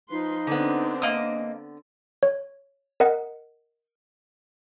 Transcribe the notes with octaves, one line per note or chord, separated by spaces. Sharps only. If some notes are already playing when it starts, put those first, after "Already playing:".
F3 D#4 B4 C6
D3 B3 C4 D4
A#3 D#5 D#6
C#5
A#4 D#5 F#5